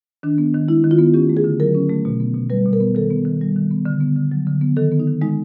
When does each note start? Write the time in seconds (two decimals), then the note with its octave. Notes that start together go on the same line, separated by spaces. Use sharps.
0.23 D#3 D4
0.38 B3
0.54 D#3
0.68 G#3 E4
0.84 D#3
0.91 F4
0.99 B3
1.14 C#4 G4
1.29 A3
1.37 G#4
1.44 D3
1.60 F#3 A#4
1.75 C#4
1.89 A3
2.05 B2
2.20 B3
2.35 B2
2.50 G3 B4
2.66 B2
2.73 A#4
2.80 B3
2.95 D#3 A4
3.11 B3
3.25 D#3
3.41 G3
3.56 D#3
3.71 B3
3.86 D3
4.01 B3
4.16 D3
4.31 F#3
4.47 D3
4.61 B3
4.76 D#3 A4
4.92 B3
5.00 D#4
5.07 D#3
5.22 G#3 D#4